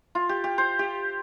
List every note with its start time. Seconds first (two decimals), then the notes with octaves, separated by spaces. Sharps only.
0.15 F4
0.29 G4
0.44 G4
0.58 C5
0.79 G4